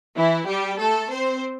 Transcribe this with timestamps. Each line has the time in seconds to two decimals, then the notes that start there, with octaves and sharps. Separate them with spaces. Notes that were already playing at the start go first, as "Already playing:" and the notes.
0.15 E3 E4
0.46 G3 G4
0.79 A3 A4
1.10 C4 C5